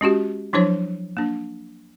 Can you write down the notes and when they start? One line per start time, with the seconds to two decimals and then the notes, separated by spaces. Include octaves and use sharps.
0.01 G#3 C#4 F#4 G4
0.53 F3 F#3 D4 E4 C5 C#5
1.17 A#3 D4